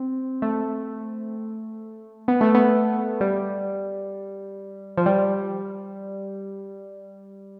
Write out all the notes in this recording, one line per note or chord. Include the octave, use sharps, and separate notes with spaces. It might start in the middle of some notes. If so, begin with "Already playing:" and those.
Already playing: C4
A3
B3
A3
B3
G3
F3
G3